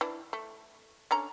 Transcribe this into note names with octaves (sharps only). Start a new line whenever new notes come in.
E3 D4
A3
D3 C#4 A#5